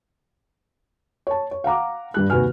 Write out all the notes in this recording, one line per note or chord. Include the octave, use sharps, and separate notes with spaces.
C#5 A5
C#5
F5 F#5 A#5 D6
G2 G3 F#6
D#2 C3 F#4 B4 G#5 F6